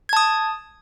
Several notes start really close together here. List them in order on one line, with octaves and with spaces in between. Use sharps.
G#6 A5 D#6